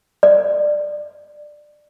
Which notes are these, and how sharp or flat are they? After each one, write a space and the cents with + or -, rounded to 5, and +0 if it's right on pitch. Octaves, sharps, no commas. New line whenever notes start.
D5 +15